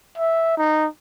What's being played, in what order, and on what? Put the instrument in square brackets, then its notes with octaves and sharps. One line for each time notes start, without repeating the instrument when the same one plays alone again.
[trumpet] E5
D#4